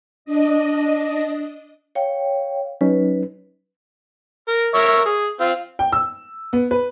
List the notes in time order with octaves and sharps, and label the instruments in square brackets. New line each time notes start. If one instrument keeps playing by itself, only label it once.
[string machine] D4 D#5
[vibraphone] C#5 F5 G5
[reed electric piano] F#3 C#4 D#4 [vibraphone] B4
[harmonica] A#4
A#4 C#5 E5
G#4
C4 F4
[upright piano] G5
E6
B3
B4